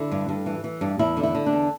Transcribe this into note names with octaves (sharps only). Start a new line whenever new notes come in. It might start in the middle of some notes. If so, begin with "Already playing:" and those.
Already playing: D3 E4
G2
G2
E3
E3
G2
E2 E4
D3
E4
D3
D4
E2